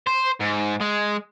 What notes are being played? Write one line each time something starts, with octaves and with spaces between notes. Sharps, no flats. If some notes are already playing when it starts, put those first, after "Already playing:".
C5
G#2
G#3